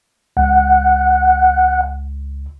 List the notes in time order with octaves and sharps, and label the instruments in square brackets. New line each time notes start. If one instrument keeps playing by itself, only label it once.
[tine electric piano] C#2 [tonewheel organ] F#5